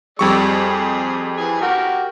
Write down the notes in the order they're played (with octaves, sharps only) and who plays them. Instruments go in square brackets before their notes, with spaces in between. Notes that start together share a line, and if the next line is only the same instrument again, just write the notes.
[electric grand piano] F2 G3 C#6 [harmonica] G#3 D5 E6
[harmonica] G#4
E3 G#4 G#5
F#4 G4 A#4